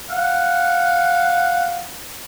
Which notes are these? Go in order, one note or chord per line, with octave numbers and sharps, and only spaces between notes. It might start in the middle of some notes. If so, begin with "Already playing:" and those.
F5 F#5